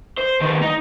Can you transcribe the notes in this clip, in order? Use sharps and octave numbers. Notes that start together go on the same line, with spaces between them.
C5
D#3 B3
D#4